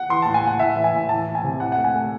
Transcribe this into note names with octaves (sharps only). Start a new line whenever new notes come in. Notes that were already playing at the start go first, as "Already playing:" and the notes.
Already playing: F#5
E3 C6
A2 A5
G#5
A2 F#5
A2 E5
E3
G#5
A2
E3 A5
E3
G#5
C3
A2 F#5
A3 F#5
G#5
A3